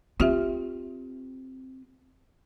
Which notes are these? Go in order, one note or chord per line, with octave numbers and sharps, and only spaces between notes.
C4 F4 G4 E5